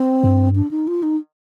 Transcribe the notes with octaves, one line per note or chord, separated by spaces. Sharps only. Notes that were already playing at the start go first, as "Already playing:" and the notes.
Already playing: C4
G2
D4
D#4
F4
D#4